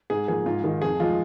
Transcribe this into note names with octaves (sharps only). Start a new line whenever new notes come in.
G#2 G#4
F3 A#3 G#4
G#2 F4
D#3 G#3
F2 G#4
F3 G#3 F4